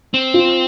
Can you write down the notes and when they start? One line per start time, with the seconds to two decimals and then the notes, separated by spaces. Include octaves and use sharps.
0.14 C4
0.34 F4